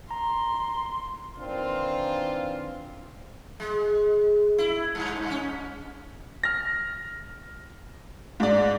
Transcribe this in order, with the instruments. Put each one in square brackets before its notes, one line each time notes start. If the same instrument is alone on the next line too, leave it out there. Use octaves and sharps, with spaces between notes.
[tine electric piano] A#5 [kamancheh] C6
[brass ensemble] D#3 E3 A#3 C4 D4 F4
[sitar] G#3
E4
G2
C#4
[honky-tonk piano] F6 A#6
G#2 D5